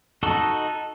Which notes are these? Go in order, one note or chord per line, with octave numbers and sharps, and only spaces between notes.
D#4 F#4 A4 D#5